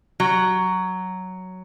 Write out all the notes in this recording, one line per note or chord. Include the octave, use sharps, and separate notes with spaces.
F#3